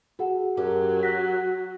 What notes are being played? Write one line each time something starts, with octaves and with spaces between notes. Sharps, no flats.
F#4 G#4 A4 F#5
F#2 F#3 G4
F#4 F#6 A#6 B6